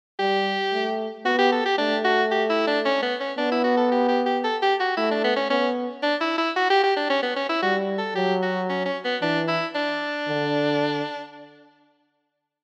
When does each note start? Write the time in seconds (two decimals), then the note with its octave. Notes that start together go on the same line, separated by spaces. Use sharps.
0.19 G3 G4
0.72 A3
1.25 B3 F#4
1.38 G4
1.52 A4
1.65 G4
1.78 A3 D4
2.05 F#4
2.31 G4
2.50 E4
2.67 D4
2.85 C#4
3.02 B3
3.20 C#4
3.37 B3 D4
3.52 E4
3.64 F#4
3.77 A4
3.91 G4
4.08 G4
4.26 G4
4.44 A4
4.62 G4
4.80 F#4
4.97 A3 E4
5.11 D4
5.24 B3
5.36 C#4
5.50 B3 C#4
6.03 D4
6.21 E4
6.38 E4
6.56 F#4
6.70 G4
6.83 G4
6.96 D4
7.10 C#4
7.22 B3
7.36 C#4
7.49 E4
7.62 G3 F#4
7.98 A4
8.15 F#3 G4
8.42 F#4
8.69 C#4
8.86 C#4
9.04 B3
9.21 E3 D4
9.48 E4
9.75 D4
10.28 D3